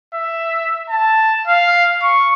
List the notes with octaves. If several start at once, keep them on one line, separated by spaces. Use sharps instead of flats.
E5
A5
F5
C#6